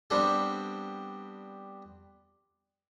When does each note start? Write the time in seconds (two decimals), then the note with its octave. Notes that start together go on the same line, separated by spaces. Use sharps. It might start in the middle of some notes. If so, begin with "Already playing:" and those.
0.10 G3 B3 C4 D4 G4 A4